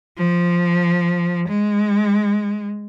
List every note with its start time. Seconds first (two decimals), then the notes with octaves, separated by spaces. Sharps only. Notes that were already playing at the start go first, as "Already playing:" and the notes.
0.18 F3
1.48 G#3